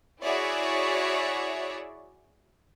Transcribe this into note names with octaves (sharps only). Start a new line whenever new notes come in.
E4 F#4 G#4 C#5 D5 E5